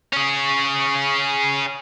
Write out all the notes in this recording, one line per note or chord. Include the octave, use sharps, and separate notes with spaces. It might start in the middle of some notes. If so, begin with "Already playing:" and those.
C#4 G#4